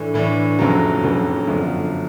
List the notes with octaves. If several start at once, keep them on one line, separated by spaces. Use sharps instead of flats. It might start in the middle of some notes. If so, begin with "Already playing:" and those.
Already playing: A2 E3 A3 D4
A2 E3 A3 D4
F#1 F2 C#3 F#3
F#1 F2 C#3 F#3
G1 F#2 D3 F3